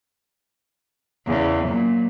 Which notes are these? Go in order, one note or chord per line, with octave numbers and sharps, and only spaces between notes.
E2 C#3
A#2 F#3